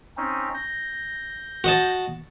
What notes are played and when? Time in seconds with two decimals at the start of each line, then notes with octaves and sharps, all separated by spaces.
0.17 C4 C#4 D#4
0.54 G6 A#6
1.64 F#4 D#5 A5